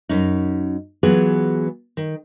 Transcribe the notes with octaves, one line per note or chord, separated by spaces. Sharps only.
F#2 A#2 C#4 D#4
E3 F#3 B3 F4 G#4 B4
D#3